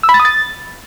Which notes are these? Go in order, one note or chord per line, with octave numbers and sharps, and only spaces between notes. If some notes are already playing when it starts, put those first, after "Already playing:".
E6
B5
A6
D#6
A6